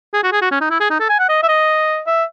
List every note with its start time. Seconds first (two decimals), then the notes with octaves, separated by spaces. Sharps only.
0.14 G#4
0.23 F#4
0.32 G#4
0.42 F#4
0.51 C#4
0.61 D#4
0.71 E4
0.80 G#4
0.90 D#4
1.00 A4
1.09 G#5
1.19 F#5
1.29 D#5
1.43 E5
1.49 D#5
2.07 E5